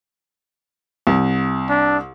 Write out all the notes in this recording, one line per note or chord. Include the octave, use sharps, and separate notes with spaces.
C2
D4